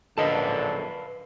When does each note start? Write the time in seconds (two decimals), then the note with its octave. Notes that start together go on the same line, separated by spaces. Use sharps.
0.18 A#1 F#2 D3 A4 B4 D#5 F5 A5